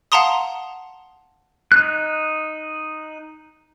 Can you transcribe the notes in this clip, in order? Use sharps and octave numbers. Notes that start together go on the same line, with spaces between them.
F5 F#5 A5 A#5 C6 D#6
D#4 F#6